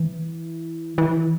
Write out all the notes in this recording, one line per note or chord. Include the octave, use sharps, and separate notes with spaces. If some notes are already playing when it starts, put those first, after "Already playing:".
Already playing: E3
E3